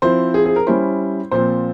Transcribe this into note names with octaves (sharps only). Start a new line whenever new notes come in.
F3 C4 E4 C5
G#4
G#4
A#4
G3 C#4 E4 C5
A#2 F3 C4 C5